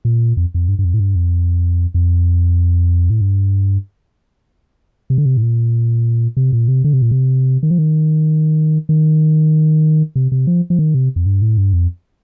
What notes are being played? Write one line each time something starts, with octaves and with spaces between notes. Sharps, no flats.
A#2
F2
F2
G2
G2
F2
A2
G2
F2
F2
A2
G2
C3
D3
C3
A2
A#2
C3
A#2
C3
D3
C3
A#2
C3
D#3
F3
D#3
D#3
C3
C3
F3
F3
D#3
C3
F2
G2
A2
G2
F2